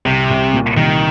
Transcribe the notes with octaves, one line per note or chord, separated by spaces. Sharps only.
C2 C3
C2
A#2
C2 D#3